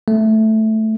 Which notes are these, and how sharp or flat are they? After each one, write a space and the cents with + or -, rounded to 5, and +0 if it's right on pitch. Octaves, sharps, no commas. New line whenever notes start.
A3 -5